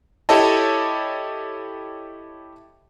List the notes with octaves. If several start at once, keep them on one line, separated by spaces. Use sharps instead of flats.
E4 G4 A4 C#5 D#5 A5